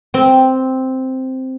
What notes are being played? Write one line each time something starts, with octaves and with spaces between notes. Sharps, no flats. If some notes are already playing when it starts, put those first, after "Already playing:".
C4